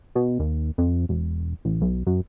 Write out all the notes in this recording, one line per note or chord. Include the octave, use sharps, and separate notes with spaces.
B2
D#2
F2
E1
A1
B1
F#2